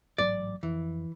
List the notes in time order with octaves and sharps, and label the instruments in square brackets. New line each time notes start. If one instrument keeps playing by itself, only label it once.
[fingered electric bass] A1 G#2 F#3 [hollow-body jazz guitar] D5
[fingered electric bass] F2 [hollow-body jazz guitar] E3